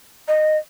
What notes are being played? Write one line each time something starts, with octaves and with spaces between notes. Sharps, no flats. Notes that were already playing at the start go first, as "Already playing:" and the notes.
D#5